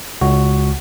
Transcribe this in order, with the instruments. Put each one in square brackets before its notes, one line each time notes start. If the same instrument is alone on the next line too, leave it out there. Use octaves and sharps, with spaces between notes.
[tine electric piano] C#2 F#4